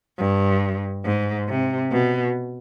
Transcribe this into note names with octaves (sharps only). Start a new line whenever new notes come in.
G2
G#2
C3
B2